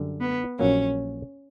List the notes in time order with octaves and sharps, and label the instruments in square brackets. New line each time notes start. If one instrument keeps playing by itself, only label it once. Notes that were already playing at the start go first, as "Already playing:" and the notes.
Already playing: [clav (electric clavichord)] F#2 D3 G3
[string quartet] B3
[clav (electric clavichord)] A#1 A#2 F#3 A#3 [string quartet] C#4